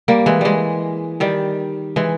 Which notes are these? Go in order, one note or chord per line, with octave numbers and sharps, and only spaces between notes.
G3 A#3
E3 G#3
E3 G3 G#3
D#3 G3
E3 G#3